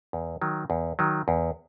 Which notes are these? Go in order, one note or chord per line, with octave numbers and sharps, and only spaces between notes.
E2
D#3 F#3
E2
D#3 F#3
E2